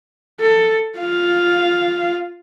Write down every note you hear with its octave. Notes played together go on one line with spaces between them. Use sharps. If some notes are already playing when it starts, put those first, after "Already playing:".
A4
F4 F5